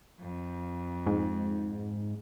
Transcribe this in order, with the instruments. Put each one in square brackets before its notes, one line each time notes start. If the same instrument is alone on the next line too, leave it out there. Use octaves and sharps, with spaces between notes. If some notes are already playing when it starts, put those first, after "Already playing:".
[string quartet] F2
[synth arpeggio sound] G#2